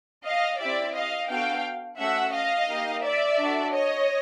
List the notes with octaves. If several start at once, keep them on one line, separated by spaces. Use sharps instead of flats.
D#5 F5
C4 E4 G4 D5 E5
D#5 F5
B3 D4 F#4 A4 F5 G5
A3 C#4 F#4 E5 F#5
D#5 F5
A#3 D#4 G4
D5 E5
D4 F#4 A4
C#5 D#5